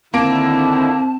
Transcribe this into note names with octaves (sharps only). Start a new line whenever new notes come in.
D3 D#3 A#3 C4 E4 A5 D7